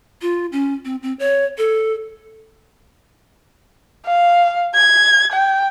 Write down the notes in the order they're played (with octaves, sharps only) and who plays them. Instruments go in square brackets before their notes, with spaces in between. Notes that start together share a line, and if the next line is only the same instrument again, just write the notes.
[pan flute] F4
C#4
C4
C4
C#5
A4
[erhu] F5
G#6
G5